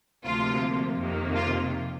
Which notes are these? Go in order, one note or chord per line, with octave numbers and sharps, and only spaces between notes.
D2 C3 F3 A#3 F4
F2 C3 D#3 A#3
F4